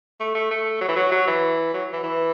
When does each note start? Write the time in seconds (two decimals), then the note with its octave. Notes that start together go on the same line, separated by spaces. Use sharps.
0.20 A3
0.35 A3
0.51 A3
0.81 F#3
0.88 E3
0.96 F#3
1.12 F#3
1.27 E3
1.74 F#3
1.93 E3
2.03 E3